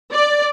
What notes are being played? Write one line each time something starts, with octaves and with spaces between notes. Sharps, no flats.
D5